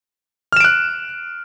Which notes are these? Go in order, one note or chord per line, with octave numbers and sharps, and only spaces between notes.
F6 F#6 D7 E7